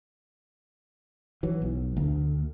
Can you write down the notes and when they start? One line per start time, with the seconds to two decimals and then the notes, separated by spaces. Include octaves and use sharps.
1.43 E3 F#3
1.62 B1
1.97 D2